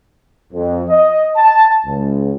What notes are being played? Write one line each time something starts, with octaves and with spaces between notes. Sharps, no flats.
F2
D#5
A5
C#2